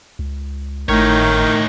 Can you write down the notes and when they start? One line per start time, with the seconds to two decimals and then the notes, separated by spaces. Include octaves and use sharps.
0.19 C#2
0.89 G#1 A2 D#3 D#4 C#5